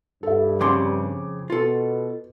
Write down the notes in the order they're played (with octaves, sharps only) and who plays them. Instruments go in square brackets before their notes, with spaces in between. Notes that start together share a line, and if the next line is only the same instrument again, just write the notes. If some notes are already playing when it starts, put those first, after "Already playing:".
[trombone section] G2 [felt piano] A4 E5
[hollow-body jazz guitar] F2 C#3 C6 [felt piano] D6
[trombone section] B2 [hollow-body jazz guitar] F4 A4